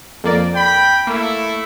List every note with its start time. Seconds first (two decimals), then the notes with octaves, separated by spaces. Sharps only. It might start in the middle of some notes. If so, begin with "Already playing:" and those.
0.24 F2 A#3 D5
0.55 G5 B5
1.07 A3 A#3 E4